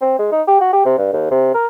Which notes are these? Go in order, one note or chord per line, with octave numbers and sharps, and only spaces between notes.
C4
G#3
D#4
G4
F#4
G4
C3
G2
D#2
C3
A#4